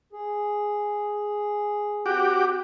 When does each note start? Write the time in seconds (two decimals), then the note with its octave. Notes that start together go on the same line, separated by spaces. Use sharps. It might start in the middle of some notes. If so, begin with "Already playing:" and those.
0.12 G#4
2.06 C4 F#4 G4 D6